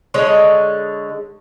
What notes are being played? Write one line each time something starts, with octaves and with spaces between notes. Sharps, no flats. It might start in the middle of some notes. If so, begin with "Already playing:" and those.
D3 G#3 C#5 D#5